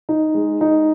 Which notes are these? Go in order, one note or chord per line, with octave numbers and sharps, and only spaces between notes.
D#4
G#3
D#4